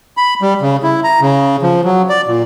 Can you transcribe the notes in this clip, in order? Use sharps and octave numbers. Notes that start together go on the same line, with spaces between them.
B5
G3
C#3
E4
A#5
C#3
F3
F#3
D5
A#2